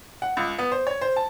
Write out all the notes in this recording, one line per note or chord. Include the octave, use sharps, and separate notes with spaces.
F#5
C#2
B3
C5
C#5
C5
A5